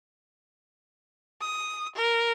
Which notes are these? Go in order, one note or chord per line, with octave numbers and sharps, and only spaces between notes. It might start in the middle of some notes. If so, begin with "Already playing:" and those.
D#6
A#4